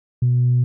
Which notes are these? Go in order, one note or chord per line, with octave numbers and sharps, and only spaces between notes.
B2